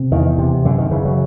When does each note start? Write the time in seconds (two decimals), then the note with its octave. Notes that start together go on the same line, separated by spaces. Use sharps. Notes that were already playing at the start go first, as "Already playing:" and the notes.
Already playing: C3
0.11 E2 D#3
0.38 C3
0.65 F#2 D3
0.78 D#3
0.91 C#3 E3
1.05 F#3